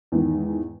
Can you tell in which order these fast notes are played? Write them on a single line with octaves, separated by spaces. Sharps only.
E2 G#2 D#3